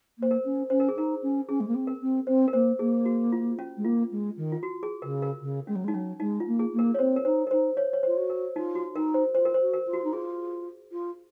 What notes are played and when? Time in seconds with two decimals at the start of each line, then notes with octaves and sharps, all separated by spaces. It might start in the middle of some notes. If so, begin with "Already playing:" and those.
0.18 A#3 C5
0.31 A#4
0.44 C#4
0.70 C#4 C5
0.80 A#4
0.89 G#4
0.96 D#4 A#4
1.22 C#4
1.49 C#4 G#4
1.60 G#3
1.67 A#3
1.74 C4
1.87 A#4
2.01 C4
2.27 C4 C5
2.48 A#4
2.53 A#3 C5
2.79 A#3 G#4
3.05 F#4
3.32 F4
3.59 C#4
3.77 G#3
3.84 A#3 F4
4.11 G#3
4.37 D#3
4.52 F4
4.63 F#4
4.83 G#4
5.02 C#3 A#4
5.22 A#4
5.41 C#3
5.67 G#3 C#4
5.75 F#3
5.84 G#3
5.88 D#4
5.94 F#3 C#4
6.20 G#3 D#4
6.40 F4
6.47 A#3
6.59 G#4
6.73 A#3
6.79 A#4
6.94 C#5
6.99 C4 C5
7.16 A#4
7.25 D#4 C5
7.47 A#4
7.51 D#4 C5
7.77 C#5
7.93 C#5
8.03 F4 C5
8.17 F#4
8.30 A#4
8.55 D#4 F4
8.75 F#4
8.95 D#4 A#4
9.14 C5
9.35 F4 C5
9.45 A#4
9.54 C5
9.60 F#4
9.73 A#4
9.87 F4
9.93 F#4
10.04 D#4
10.12 F4 G#4
10.92 F4